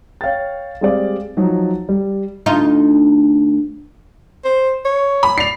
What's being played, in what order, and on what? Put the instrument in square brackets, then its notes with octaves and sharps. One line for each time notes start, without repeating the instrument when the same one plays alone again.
[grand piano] C#5 F5 G5 A6
G3 G#3 C4 G#4 D5 F5
F3 F#3 D#4
G3
[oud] D2 D#4 F4
[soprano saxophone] C5
C#5
[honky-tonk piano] B5
[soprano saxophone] D5 [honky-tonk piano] C7 F7